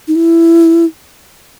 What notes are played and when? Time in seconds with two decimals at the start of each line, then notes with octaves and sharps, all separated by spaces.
0.08 D#4
0.15 E4